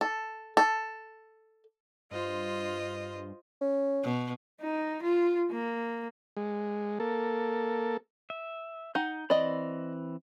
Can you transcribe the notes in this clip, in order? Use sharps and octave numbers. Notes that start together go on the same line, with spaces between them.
A4
A4
G2 F4 C5 D#5
C#4
B2
D#4
F4
A#3
G#3
A#3 A4
E5
D#4 F#5 G6
E3 C4 D5 D#5 B5